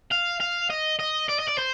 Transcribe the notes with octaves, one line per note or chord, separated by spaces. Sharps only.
F5
F5
D#5
D#5
D5
D#5
D5
C5